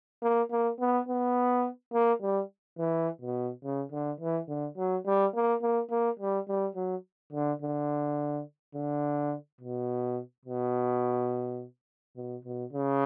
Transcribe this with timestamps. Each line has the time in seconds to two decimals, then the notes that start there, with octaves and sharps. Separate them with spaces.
0.22 A#3
0.51 A#3
0.80 B3
1.09 B3
1.93 A#3
2.22 G3
2.79 E3
3.22 B2
3.64 C#3
3.92 D3
4.20 E3
4.48 D3
4.77 F#3
5.06 G3
5.35 A#3
5.62 A#3
5.90 A#3
6.19 G3
6.48 G3
6.76 F#3
7.33 D3
7.62 D3
8.75 D3
9.61 B2
10.45 B2
12.17 B2
12.45 B2
12.73 C#3